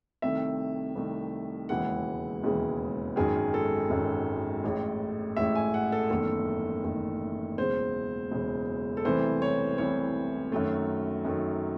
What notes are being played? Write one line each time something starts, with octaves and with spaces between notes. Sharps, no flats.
C2 C3 D#3 A3 E5
C2 C3 D#3 A3
E1 D#2 C#3 E3 G#3 F#5
E1 D#2 C#3 E3 G#3
G#1 F#2 D#3 G#4
A4
G#1 F#2 D#3
A1 A2 G#3
A1 A2 G#3 E5
G#5
F#5
A4
F#1 E2 D#3 A3 A4
F#1 E2 D#3 A3
E1 E2 C#3 C5
E1 E2 C#3
A4
C2 C3 E3 A3 C5
C#5
C2 C3 E3 A3 C#5
F#2 D#3 F#3 A3
F#2 D#3 F#3 A3